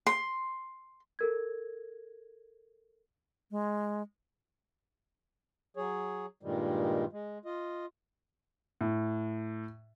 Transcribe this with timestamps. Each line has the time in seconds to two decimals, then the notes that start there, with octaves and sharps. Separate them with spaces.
0.07 C6
1.19 A4 A#4 G#6
3.51 G#3
5.77 F#3 G#4 C#5
6.43 G2 A#2 D#3 G3 G#3
7.13 G#3
7.45 F4 D#5
8.81 A2